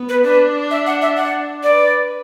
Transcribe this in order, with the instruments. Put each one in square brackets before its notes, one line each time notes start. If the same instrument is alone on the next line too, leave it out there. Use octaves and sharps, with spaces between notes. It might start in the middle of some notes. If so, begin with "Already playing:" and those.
Already playing: [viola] B3
[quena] B4
[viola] D4 [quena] B4
[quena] E5
F#5
E5
F#5
[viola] B4 [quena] D5